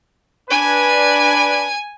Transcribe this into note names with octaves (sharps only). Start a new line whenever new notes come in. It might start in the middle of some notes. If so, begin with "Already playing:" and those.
D4 B4 G#5